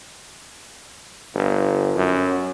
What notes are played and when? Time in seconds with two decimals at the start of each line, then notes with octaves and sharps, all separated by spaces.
1.35 G1
1.95 F#2